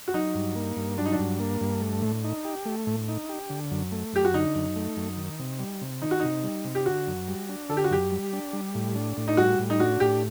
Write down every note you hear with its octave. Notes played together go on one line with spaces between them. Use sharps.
F#4
F#3 D#4
G2
A#3
G2
F#3 D4
D#4
D4
G2
A#3
G2
A3
A2
D#4
G4
A3
A2
D#4
G4
D3
F#2
A3
F#2 G4
F#4
D3 D#4
F#2
A3
F#2
D#3
C3
G3
C3
D#3 D#4
F#4
C3 D#4
G3
C3
G4
D3 F#4
F#2
G3
D4
D3 A4
G4
F#4
F#2 G4
G3
D4
G3
A2
D4
A2
D#4
G3 F#4
A2
D#4
D4 F#4
A2 G4